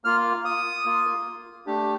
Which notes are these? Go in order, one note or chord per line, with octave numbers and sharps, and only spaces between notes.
A#3 F4 F6
D#6
A#3 F4
A3 D4 G4